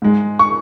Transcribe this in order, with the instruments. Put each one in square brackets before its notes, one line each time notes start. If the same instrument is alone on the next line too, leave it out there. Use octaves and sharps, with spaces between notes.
[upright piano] G#2 G#3
C#6